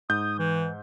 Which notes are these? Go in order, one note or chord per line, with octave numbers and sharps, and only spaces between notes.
G#2 D#6 G6
E3